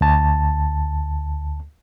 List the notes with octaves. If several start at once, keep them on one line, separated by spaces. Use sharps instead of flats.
D2 A5